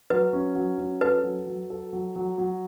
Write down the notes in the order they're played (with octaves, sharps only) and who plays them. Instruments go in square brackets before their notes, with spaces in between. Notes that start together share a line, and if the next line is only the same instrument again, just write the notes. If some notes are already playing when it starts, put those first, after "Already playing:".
[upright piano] F#3 [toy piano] B4
[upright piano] C#4
F#3
C#4
[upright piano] A4 [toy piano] B4
[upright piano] F#3
F#3
A4
F#3
F#3
F#3